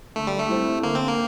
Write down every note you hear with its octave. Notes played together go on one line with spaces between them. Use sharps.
D3 A3
G3
A3
G3 C4 E4
D3 A#3
C4
A#3